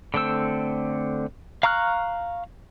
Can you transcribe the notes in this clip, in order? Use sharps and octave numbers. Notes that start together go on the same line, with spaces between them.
D3 A3 C4 E6
F5 A#5 C#6 F6 F#6